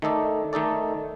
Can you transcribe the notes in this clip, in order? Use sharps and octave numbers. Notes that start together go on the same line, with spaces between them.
D#3 A3 D#4 A4 D5
D#3 A3 D#4 A4 D5